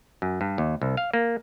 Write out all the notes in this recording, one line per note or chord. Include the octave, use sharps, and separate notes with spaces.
F#2
G2
D#2
C2
F5
A#3